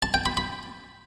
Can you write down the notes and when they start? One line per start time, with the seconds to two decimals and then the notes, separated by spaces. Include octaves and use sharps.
0.02 A5
0.14 G5
0.26 B5
0.37 B5